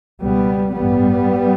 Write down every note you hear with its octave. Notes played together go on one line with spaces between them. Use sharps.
C#2 B2 G3 B3
A1 G2 G3 B3